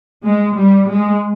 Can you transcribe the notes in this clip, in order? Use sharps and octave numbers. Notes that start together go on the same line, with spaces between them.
G#3
G3
G#3